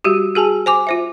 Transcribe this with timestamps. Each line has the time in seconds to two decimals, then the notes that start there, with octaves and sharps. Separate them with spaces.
0.04 G3 F#4 G4
0.35 F#4 G#4 G#5 A5
0.66 C5 G#5 D6
0.87 F4 C5 E5